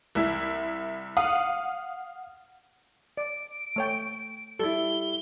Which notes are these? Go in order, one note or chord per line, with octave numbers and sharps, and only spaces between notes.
C2 E4
F5 F#5 D#6
D5 D7
A3 C#5 G5
G3 E4 A4 G7